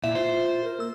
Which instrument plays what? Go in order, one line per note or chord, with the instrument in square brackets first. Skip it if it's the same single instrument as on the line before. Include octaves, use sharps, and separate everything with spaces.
[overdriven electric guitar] A#2 [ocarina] E4 [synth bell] E5
[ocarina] F4 [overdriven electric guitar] C5
[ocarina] A#4
[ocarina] A#3 [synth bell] E6